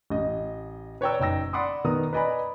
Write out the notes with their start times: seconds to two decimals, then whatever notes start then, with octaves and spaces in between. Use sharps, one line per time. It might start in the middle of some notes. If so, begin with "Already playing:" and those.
0.10 A1 D#5
1.01 B4 C#5 D5 G5 A#5 E6
1.20 F#1 D#4 G5 E6 A#6
1.53 D5 F#5 B5 C6 D6 D#6
1.84 D#3 B3 A#5 D#6
2.13 B4 D5 D#5 G#5 A#5 B5